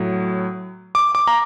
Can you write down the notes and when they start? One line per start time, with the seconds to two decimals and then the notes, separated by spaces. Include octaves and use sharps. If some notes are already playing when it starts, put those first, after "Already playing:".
Already playing: A2 F#3
0.95 D6
1.15 D6
1.27 A#5